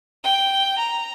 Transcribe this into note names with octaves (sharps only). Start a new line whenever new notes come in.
G5
A#5